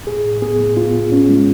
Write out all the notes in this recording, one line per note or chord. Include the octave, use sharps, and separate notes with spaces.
A2 G#4
A2
B3 G#4
A2
B3 F4
A2
B3 C#4
G#3